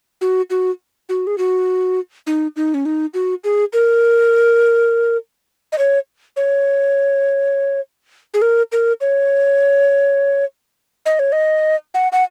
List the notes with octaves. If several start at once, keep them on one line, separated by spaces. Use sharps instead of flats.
F#4
F#4
F#4
G#4
F#4
D#4
D#4
C#4
D#4
F#4
G#4
A#4
D#5
C#5
C#5
G#4
A#4
A#4
C#5
D#5
C#5
D#5
F#5
F#5